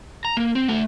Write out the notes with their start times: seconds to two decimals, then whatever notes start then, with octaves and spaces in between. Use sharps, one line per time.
0.25 A#5
0.37 A#3
0.55 C4
0.68 A3 F#5